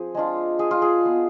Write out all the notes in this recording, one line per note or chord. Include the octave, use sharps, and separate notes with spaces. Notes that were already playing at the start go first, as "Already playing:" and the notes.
Already playing: F3 C4 G#4
G#3 D4 F4
G#4
F4
G#4
B3 F4